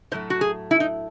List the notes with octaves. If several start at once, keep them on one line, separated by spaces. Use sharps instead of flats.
A2 F#3 A3 C5
F#4
G#4
E4
D#4